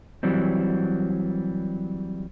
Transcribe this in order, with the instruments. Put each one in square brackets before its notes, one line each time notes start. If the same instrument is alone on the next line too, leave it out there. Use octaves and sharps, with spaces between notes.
[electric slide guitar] E3 F#3 G3 C4